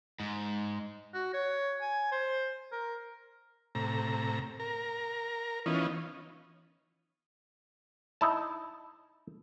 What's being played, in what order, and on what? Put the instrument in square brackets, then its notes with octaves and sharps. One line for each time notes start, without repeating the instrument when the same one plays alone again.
[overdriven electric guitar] G#2
[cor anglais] F#4
C#5
G#5
C5
A#4
[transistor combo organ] A2 C3 A#5
A#4
E3 B3 C#4 D#4 F4
[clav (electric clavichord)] D#4 E4 A5